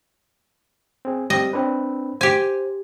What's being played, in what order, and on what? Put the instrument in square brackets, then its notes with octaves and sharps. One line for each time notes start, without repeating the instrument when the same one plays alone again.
[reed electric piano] C4 G#4
[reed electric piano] G3 C4 G4 [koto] D#5
[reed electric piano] C4 D4 B4
[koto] G4 G#5 [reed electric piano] C5